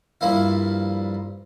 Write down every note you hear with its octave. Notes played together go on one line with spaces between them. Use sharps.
G2 F3 A#3 E4